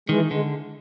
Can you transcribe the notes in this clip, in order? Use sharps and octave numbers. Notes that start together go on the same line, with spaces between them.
D#3 E3 G#3
D3 G#3